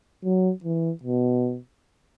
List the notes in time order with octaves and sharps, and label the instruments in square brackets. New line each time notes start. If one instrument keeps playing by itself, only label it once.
[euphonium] F#3
E3
B2